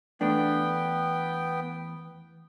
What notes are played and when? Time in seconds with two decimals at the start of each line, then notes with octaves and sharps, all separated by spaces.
0.21 E2 A3 B3 D4 G5